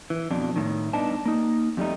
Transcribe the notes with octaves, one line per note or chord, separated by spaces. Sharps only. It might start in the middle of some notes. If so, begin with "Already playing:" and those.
E3
F2 B2 D4
A2 D#3
G2 B3 D4 D#4 A5
A#3 D#4
F2 G3 A3 D#4